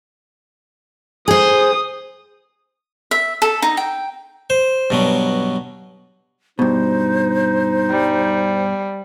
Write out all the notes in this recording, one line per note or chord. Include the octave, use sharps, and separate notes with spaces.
G#4 C5 D#6
E5
A4
D#4
G5
C5
G2 B2 F#3
G2 B2 D#4 C5
G3